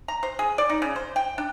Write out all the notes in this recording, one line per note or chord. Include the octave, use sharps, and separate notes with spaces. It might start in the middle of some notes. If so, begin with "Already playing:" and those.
A#5
C5
G#4
D5
D#4
C#3
C5
G5
D4